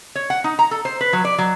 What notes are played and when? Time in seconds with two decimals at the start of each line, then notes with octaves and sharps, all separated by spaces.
0.15 C#5
0.30 F#5
0.44 D#4
0.59 A#5
0.71 A4
0.85 C5
1.01 B4
1.13 F#3
1.25 D5
1.38 F#3